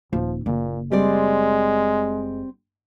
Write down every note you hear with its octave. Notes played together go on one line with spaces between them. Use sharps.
D#1 F3
F#1 A#2
G3 G#3 C4 D5